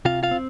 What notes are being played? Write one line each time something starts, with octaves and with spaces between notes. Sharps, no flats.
C3 F4 F5
F4 F5
C4